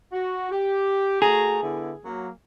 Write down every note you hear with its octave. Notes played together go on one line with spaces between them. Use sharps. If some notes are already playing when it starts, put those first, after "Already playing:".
F#4
G4
A3 F#4 G#4 A#5
D3 B3 E4
F#3 A#3